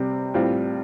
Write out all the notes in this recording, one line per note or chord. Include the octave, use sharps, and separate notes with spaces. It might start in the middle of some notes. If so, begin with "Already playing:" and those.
Already playing: C3 G3 C4
A2 G3 C4 F4